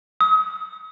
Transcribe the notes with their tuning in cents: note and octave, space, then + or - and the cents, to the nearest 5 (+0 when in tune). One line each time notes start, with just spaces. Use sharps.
D#6 +35